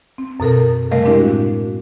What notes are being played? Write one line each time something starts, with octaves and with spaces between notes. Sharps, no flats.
C4
F#2 B2 A4 A#4
C3 G3 A3 A#4 D#5 F5
G#3 C4 D4 E4 G4 D#5
A2 F#4